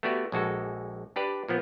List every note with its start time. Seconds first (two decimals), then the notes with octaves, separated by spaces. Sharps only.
0.03 A3 B3 F#4 G4 D5
0.32 A#1 G#3 F#4 A4
1.16 D4 G4 B4 D5
1.49 A#2 F3 B3